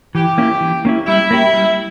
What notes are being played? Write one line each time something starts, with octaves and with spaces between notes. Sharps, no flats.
E3 G4
A#3 C#4 E4
E3
A#3 C#4 E4
G3 E4
A#3 C#4 G4
G3